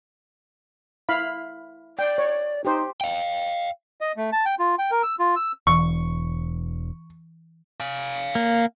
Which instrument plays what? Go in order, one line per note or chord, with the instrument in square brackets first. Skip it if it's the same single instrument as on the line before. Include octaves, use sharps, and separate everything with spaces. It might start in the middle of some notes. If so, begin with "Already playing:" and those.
[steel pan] E4 F5 B5
[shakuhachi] D5 [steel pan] G5
[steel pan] C#5
[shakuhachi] D#4 [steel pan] G4 C5
[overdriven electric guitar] F5 G5
[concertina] D#5
A3
A5
G5
F4
G5
A#4
E6
F4
E6
[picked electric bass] E1 [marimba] E3 [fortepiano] C#6
[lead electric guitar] F5 G#5
[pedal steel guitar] A#3